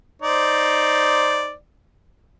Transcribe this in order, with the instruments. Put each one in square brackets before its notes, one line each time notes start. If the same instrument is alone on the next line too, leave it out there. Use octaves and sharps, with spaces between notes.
[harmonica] D#4 C5 D5